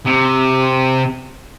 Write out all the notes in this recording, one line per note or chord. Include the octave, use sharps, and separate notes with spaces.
C3